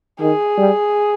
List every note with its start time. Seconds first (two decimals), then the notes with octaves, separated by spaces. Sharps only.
0.20 D#3 G#4
0.58 G3